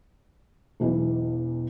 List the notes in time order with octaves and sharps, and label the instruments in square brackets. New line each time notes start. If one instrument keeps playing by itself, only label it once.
[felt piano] E1 B1 E3